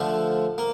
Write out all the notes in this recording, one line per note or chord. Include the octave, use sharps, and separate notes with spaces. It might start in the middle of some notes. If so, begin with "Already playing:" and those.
Already playing: D3 F3 A3
A#3